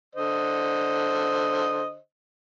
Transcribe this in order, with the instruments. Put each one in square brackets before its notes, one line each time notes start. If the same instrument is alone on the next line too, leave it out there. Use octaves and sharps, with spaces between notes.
[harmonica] D3 C5 D#5